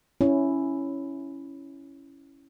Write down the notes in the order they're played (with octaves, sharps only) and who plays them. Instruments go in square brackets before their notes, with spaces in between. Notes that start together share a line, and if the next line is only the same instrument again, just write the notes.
[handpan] C#4 E4